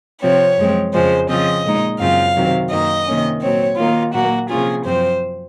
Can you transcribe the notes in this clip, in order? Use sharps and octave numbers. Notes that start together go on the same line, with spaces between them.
C3 F3 C4 C#5
F#2 F3 G#3 C4
F2 C#3 F3 G#3 C5
C#3 F3 C4 F4 D#5
A#2 G#3 D#4
F#2 C#3 F#3 C4 F4 F5
C3 D#3 F#3 C4
F#2 D#3 A#3 D#5
C3 D#3 A#3 C#4
A#2 F#3 C4 C#5
D#3 A#3 D#4 F4
A#2 F#3 A#3 F#4
C3 F3 A#3 C#4 F4 G#4
F#2 F3 C4 C5